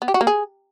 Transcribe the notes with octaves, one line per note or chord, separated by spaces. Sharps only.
B3
G4
F#4
A#3
G#4